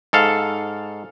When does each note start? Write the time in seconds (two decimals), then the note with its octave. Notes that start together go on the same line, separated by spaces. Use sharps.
0.13 G#2 A4 F5